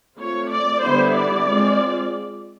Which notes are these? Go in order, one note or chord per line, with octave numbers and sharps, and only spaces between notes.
A3 C4 F4 C#5
D5
D3 G3 B3 E4 C5
D5
G#3 C4 F4